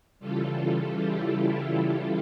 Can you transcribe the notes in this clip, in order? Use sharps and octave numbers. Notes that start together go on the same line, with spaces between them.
C#3 E3 G3 F4 A4
E4 G4
E4
F4